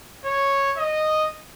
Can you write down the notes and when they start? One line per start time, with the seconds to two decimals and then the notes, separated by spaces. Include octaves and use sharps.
0.25 C#5
0.78 D#5